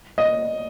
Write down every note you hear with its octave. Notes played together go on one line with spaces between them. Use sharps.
D#5